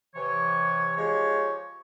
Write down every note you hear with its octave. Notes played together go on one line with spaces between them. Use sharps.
C3 E3 C#5
F3 G#3 G4 C#5